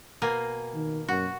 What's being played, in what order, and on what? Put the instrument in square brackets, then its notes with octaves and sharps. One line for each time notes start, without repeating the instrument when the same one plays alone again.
[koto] B2 A#3 G#5
[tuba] D#3
[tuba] F#2 [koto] F#4